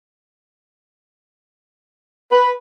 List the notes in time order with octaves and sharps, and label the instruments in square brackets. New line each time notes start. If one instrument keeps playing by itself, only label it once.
[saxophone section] B4